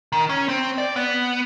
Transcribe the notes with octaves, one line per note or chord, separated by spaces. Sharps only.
D#3
C#4
C4
D5
B3